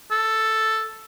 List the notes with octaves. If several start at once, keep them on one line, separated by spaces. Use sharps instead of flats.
A4